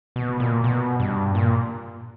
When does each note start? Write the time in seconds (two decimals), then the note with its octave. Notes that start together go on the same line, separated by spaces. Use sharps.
0.16 B2
0.40 A#2
0.64 B2
1.00 G2
1.35 A#2